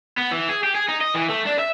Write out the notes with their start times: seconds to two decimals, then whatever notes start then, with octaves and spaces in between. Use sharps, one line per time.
0.18 B3
0.32 E3
0.49 G#4
0.64 G4
0.75 G#4
0.89 D#4
1.01 D#5
1.15 E3
1.30 A3
1.47 D4
1.59 E5